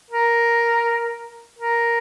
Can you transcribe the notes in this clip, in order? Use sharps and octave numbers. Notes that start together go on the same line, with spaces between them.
A#4
A#4